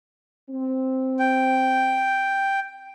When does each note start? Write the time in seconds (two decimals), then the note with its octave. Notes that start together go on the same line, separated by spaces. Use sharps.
0.50 C4
1.19 G5